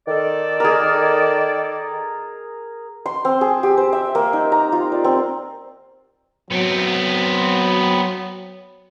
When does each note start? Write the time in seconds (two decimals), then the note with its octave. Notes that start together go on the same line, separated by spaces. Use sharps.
0.08 D#3 A4 D5
0.60 G#4 A#4
3.06 C6
3.25 C4
3.41 G#4
3.63 G4
3.77 C5
3.93 E5
4.15 A#3
4.33 D#4
4.52 A#5
4.72 F4
4.92 D5
5.04 C4
6.51 F#3 B3 C4